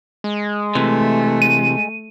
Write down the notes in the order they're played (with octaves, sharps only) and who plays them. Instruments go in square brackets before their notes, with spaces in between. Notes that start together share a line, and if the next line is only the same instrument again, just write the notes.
[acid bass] G#3
[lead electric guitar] C3 E3 [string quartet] A3
[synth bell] D#7